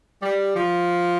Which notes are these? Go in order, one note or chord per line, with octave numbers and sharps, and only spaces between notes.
G3
F3